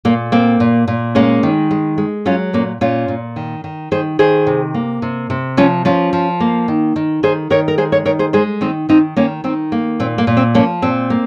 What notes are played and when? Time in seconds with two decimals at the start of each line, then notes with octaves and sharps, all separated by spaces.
0.05 A#2 A#3
0.32 A#3 C4
0.60 A#2
0.88 A#2
1.15 G#3 A#3 C#4
1.43 D#3
1.71 G#3
1.98 G#3
2.26 F#3 C#4 F4
2.53 A#2 A#3 C#4
2.81 A#2 C#4 F4
3.08 A#2
3.36 D#3
3.64 D#3
3.91 D#3 G#4 C5
4.19 D#3 G#4 C5
4.47 C3
4.74 A#3
5.02 C3
5.30 C3
5.57 F3 C#4 F4
5.85 F3 C#4 F4
6.13 F3
6.40 A#3
6.68 D#3
6.96 D#3
7.23 D#3 G#4 C5
7.50 D#3 A#4 C#5
7.68 A#4
7.78 G#3 G#4 C5
7.92 A#4 C#5
8.06 D#3 A#4 C#5
8.19 G#4 C5
8.33 G#3 G#4 C5
8.61 D#3 C4 D#4
8.89 D#3 C4 D#4
9.16 D#3 A#3 C#4
9.44 D#3 C4
9.72 A#3
10.00 A#2 C4
10.18 A#3
10.27 A#2
10.37 C4
10.54 F3 A#3 C#4
10.82 A#2 C4
11.10 A#3